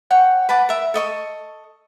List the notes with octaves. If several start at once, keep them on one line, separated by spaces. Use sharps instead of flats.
C#5 F#5 G5
B4 F#5 A5 D6
A#4 E5
A4 D#5 C#6